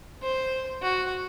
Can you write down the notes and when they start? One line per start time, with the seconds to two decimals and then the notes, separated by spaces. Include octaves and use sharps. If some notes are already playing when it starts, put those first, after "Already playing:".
0.22 C5
0.81 F#4